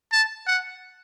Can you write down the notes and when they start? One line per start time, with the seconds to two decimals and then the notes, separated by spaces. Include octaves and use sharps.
0.12 A5
0.47 F#5